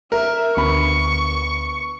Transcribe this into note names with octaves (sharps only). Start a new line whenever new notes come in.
A#4 E5
D2 B3 B5 C#6